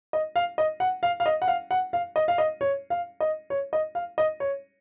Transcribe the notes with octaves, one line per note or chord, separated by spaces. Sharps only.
D#5
F5
D#5
F#5
F5
F5
D#5
F#5
F5
F#5
F5
D#5
F5
D#5
C#5
F5
D#5
C#5
D#5
F5
D#5
C#5